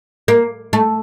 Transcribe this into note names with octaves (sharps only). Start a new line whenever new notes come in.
A#3
A3